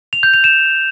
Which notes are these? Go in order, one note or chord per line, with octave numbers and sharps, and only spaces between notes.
F7
G6
F7
E7